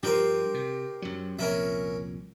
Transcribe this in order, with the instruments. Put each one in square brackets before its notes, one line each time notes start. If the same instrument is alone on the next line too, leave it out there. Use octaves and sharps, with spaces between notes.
[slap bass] G2 F3 [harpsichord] G4 A#4 C5
[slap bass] C3
F#2 F#3
[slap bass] C2 F2 A#2 [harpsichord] C#4 A#4 E5